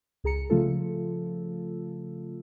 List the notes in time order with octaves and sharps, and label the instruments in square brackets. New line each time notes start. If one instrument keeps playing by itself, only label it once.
[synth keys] C#2 G#4 A#5 C#7
C#3 F3 A3 F4 A4